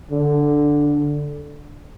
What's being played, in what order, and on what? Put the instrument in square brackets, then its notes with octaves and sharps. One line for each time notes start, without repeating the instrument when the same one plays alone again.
[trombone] D3